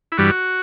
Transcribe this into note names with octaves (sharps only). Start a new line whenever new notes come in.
E4
G2 E3 G3 F#4